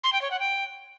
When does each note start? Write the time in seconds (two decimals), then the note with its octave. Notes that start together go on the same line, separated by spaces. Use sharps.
0.04 C6
0.13 G5
0.22 C#5
0.31 F#5
0.40 G5